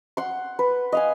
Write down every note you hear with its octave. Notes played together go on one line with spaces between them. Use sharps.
F#5 C6
B4
D#5 F5 G#5